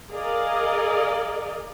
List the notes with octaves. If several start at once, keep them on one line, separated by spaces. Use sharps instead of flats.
G#4 A#4 D5 D#5 F5